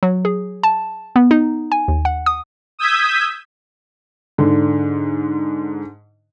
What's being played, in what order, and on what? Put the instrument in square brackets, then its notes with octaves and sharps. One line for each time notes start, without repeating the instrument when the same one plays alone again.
[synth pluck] F#3
G#4
A5
B3
D#4
G#5
D#2
F#5
D#6
[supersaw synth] D#6 E6 G6 G#6 B6
[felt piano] G#2 D3